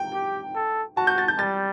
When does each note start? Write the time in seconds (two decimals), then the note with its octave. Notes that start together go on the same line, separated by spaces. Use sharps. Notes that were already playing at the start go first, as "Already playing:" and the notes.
Already playing: G5
0.13 G4
0.55 A4
0.97 F#4 A5
1.07 G6
1.18 A6
1.28 G6
1.39 G3 A6